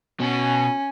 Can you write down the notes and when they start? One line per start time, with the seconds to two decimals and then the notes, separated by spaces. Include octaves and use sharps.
0.20 B2 C#4 G#5